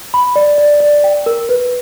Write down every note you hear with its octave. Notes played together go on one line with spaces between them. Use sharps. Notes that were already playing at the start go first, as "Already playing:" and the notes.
B5
D5
D5
D5
G5
A#4
B4